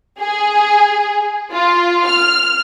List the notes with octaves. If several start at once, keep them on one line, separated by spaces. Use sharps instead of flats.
G#4
F4
F6